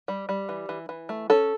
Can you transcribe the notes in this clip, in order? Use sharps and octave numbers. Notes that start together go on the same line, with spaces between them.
G3
G3
E3
E3
E3
A3
C#4 A4